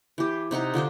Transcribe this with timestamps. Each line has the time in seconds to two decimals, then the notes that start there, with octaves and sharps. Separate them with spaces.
0.18 E3 G4
0.51 C3 D#4 F#5 A#5
0.74 D3 F3 D4 C5